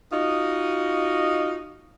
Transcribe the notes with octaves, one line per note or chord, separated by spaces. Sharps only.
D#4 F4 F#4 D#5